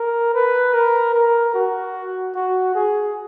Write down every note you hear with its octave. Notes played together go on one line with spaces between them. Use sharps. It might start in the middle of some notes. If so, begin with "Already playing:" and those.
Already playing: A#4
B4
A#4
A#4
F#4
F#4
G#4